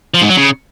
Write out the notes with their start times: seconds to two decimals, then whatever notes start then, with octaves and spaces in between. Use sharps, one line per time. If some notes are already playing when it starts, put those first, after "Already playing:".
0.14 F3
0.22 G#2
0.29 F#3
0.37 C#3